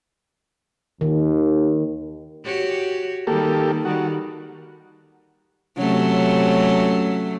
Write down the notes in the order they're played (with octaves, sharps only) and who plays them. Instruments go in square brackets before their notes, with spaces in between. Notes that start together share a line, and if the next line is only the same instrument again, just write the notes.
[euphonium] D#2 [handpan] D#3
[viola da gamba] F#4 G4 C#5
[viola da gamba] D#3 G3 [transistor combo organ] A#3 G4 A4
[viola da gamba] D#3 G3 [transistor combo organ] F#4
[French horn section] C3 C#4 [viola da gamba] F#3 A3